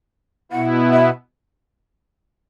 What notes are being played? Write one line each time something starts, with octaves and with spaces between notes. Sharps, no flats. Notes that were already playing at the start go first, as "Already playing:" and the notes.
B2 B3 E4 F#5
E5